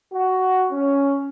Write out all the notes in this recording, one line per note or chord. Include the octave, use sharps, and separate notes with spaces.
F#4
C#4